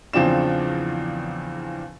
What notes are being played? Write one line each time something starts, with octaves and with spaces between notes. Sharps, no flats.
E2 C#3 F3 C4 D4 E7